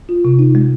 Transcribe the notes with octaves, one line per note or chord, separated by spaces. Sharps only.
F4
C3
D#4
G#3